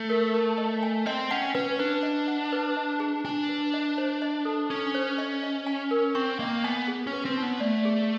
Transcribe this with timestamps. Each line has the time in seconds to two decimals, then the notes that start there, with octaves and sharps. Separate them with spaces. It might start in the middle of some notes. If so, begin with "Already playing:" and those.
Already playing: A3
0.10 A#4
0.34 A#4
0.58 D#5
0.83 G#5
1.06 C4 D#5
1.31 C#4 F#5
1.55 C#4 B4
1.79 D4 B4
2.03 D#5
2.28 F#5
2.52 B4
2.77 D#5
3.00 G#4
3.25 D4 G#5
3.49 B4
3.74 D#5
3.98 C5
4.22 D#5
4.45 A4
4.70 C#4 A4
4.95 C5
5.18 D#5
5.43 D#5
5.66 G#5
5.91 A#4
6.15 C4 C#6
6.39 A#3 D#5
6.64 B3 G#5
6.88 G#4
7.07 C#4
7.13 B4
7.25 C4
7.37 D#4
7.43 B3
7.60 A3 D5
7.85 G#4